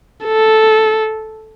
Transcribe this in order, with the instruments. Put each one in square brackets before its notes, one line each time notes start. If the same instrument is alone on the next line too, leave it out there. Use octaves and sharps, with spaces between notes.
[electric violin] A4